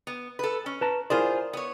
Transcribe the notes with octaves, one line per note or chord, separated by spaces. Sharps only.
B3
A4 B4
C#4
B4 A5 A#5
E4 F4 G#4 A#4 C5 D5
B3 C#5